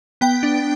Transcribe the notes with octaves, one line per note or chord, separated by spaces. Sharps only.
B3 G5
D4